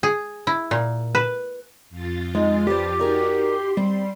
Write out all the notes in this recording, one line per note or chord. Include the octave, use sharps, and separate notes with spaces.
G#4
E4
A#2
B4
F2 F4 A6
G#3 D#4
D4 G4 B4 C5
D#4 F#4 G#4 A#4 D5
C6
G3 C4